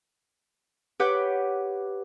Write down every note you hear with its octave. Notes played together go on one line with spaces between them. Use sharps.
G4 B4 C#5 F#5 D6 G6